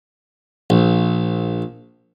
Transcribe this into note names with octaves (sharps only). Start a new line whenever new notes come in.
A#1